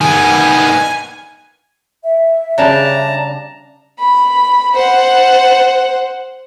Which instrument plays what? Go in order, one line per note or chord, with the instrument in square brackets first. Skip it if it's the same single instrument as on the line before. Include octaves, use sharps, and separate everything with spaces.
[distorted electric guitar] D#3 B3 [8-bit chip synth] G#5
[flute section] E5
[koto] C#3 G3 D4 [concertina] A5 A#5
[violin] B5
C5 F#5